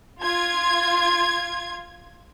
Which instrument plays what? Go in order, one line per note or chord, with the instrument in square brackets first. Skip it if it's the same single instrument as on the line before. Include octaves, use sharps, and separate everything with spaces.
[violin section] F4 G#6